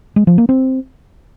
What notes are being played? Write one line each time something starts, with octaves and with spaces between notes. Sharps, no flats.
G#3
F3
A#3
C4